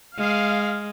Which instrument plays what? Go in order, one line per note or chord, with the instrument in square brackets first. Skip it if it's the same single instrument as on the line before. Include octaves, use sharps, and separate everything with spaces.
[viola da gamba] G#3 [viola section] F5